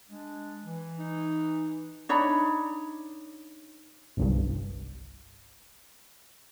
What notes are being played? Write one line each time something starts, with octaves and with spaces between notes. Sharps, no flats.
G#3 D4
E3
D#4
D4 D#4 C#5 B5
G1 C2 G2